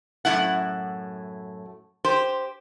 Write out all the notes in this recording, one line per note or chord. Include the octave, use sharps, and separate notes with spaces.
F#2 A2 F3 E4 F#5
G4 C5